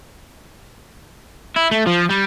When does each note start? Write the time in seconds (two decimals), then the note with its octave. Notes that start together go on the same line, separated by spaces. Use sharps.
1.57 E4
1.71 A3
1.86 F3
2.09 G3